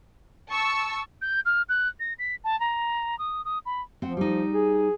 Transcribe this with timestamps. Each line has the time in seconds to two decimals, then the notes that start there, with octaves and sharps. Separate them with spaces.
0.49 A5 C#6 E6
1.22 G6
1.45 F6
1.69 F#6
2.00 A#6
2.19 B6
2.44 A5
2.60 A#5
3.19 D#6
3.45 D#6
3.66 B5
4.02 F3 C4 F#5
4.17 G3 D#4
4.53 G#4